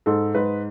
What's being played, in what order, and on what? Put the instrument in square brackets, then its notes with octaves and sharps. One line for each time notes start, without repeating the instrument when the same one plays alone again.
[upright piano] G#2 A4
G#2 B4